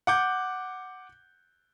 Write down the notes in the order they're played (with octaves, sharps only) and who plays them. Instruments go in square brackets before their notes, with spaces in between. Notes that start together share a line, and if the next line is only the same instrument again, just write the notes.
[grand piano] F#5 D6 G6